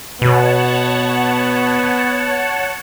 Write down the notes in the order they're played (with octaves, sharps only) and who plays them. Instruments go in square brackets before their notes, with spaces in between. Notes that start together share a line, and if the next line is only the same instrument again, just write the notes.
[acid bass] B2 [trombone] B3 [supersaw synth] C#5 F#5 A5